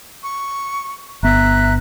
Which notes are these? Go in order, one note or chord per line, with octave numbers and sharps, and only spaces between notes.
C#6
G1 B3 E5 A#5 F#6